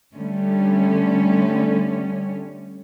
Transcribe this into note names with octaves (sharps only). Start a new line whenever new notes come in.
D3 G3 A3 C#4